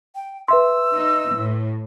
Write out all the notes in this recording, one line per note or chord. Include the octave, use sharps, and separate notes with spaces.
G5
B4 E5 C6 E6
D#4
A2